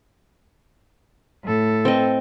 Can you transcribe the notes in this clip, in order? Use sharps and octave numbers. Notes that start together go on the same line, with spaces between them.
A2 A4
C4 D#5